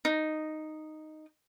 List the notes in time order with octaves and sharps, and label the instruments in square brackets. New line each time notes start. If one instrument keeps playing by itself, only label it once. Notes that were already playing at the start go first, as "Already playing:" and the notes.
[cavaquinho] D#4